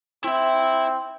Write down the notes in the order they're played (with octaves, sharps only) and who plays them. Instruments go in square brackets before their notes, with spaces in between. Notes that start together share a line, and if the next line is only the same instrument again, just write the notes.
[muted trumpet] C4 [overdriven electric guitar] E4 E5